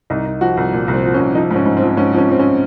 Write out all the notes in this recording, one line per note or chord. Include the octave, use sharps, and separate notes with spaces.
C2 D#4
C2
F3 F#4
C2
A#2
C2
C4
F3
C#4
C2
F3 D#4
G#2
C#4
G#2
C4
F3
G#2 C#4
F3
C#4
F3 C4
C#4